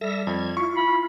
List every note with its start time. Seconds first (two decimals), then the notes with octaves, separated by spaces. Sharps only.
0.01 G3 A4 E5 A#6
0.27 F2 G#6
0.57 E4 F4 C#6
0.77 B5